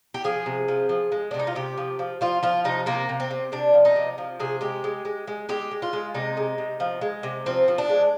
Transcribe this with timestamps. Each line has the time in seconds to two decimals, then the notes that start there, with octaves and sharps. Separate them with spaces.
0.14 G4
0.24 F3 G#4
0.46 C3
0.68 F3
0.89 F3
1.12 G#3
1.31 D4
1.34 C3
1.39 D#4
1.47 F4
1.55 C3 G4
1.78 F3
1.99 F3
2.21 F3 F4
2.43 F3 F4
2.64 C3 D#4
2.86 C3 A#3
3.09 C3
3.20 C4
3.31 C3
3.52 C3 D4
3.73 F3
3.85 D#4
3.96 C3
4.18 F3
4.39 C3 G#4
4.61 G#3 G4
4.84 G#3
5.05 G#3
5.28 G#3
5.49 G#3 G4
5.71 G#3
5.82 F4
5.93 G#3
6.15 C3 D#4
6.37 G#3
6.58 C3
6.80 F3
7.01 G#3
7.23 C3
7.46 F3 C4
7.68 F3
7.78 D4
7.90 G#3